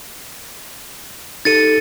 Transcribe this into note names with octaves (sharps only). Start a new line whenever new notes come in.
D#4 G4 A4 A6 C#7 D#7